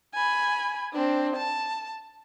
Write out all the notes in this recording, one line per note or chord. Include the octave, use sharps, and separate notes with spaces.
G#5 B5
C4 D4
A5